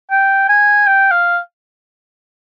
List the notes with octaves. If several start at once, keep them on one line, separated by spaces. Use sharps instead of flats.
G5
G#5
G5
F5